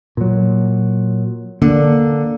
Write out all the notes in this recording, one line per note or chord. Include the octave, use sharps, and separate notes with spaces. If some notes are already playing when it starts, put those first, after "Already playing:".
A#2 F#3
D3 A#3 D4